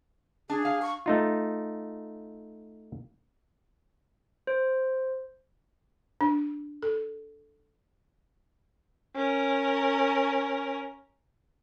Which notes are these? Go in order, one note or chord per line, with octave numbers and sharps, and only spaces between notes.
D4 G#4
F5
C#6
A3 D#4 F4
C5
D4
A4
C#4 A#4